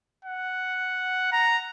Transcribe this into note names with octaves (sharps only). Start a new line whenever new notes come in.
F#5
A#5